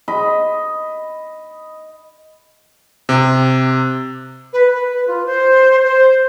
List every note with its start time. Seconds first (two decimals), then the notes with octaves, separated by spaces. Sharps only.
0.08 D#5 B5
3.09 C3
4.53 B4
4.74 B4
5.07 F4
5.26 C5
5.84 C5